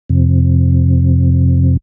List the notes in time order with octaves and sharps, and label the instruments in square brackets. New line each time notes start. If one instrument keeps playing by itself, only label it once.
[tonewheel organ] F2 C3